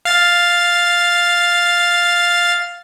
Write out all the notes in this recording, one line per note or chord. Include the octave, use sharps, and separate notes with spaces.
F5 A6